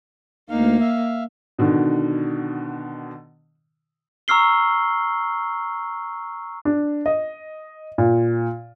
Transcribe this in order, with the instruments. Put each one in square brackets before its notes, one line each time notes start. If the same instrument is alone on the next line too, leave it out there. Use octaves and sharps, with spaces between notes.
[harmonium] D2 D#4 F5 [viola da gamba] A#3
[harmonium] E5 F5
[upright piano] B2 D3 D#3
[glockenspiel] A#5 C#6 E6 F6 C7 G7
[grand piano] D4
D#5
A#2